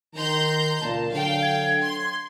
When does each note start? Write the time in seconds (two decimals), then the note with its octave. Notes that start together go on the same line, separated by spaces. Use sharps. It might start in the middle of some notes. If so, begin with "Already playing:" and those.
0.15 D#3 A#5 C6 G6
0.81 C#2 A#2 A5
1.11 D3 F#3 F5 G5
1.42 G#6
1.82 C6